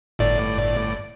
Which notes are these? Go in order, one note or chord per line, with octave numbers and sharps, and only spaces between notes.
G1 A2 D5